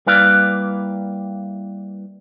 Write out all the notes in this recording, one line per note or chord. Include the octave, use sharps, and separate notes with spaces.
G3 A#3 E4 B4 D5 F5